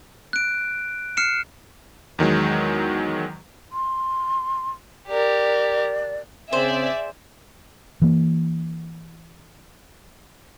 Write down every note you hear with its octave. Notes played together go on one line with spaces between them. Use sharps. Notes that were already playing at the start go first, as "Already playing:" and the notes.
F#6 D7
F6 C7 C#7 E7
E2 D#3 F#3 G#3
C6
G4 A#4 D5
C#3 C4 G#4 C5 D5 E5
E3 A#3